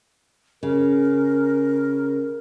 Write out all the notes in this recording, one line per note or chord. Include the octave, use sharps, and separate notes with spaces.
C#3 A#4